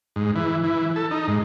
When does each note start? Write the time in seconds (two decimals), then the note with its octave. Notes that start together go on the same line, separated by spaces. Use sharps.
0.16 G#2
0.35 E3
0.64 E3
0.96 A4
1.11 D#4
1.28 G#2